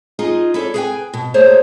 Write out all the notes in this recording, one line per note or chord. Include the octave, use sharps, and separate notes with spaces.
D#4 F4 G#4 D#5
E4 A4 B4 C#5 D5
G#4 B4 C#5 F5 G5 G#5
B2
A3 A#3 G#4 C5 C#5